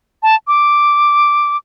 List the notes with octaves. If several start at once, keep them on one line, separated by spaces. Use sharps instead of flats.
A5
D6